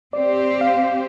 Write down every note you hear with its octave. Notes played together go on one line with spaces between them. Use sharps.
C4 G4 C5 D5
F5